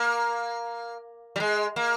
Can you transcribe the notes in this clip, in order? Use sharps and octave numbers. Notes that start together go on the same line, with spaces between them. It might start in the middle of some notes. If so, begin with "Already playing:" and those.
Already playing: A#3
G3
G#3
A#3